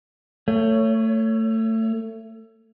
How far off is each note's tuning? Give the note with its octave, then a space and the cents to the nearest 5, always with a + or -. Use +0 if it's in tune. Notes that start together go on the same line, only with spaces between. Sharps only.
A3 +25 C#5 +10